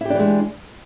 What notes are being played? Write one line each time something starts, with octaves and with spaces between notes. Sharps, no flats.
E3 G#3 D4 E4 G4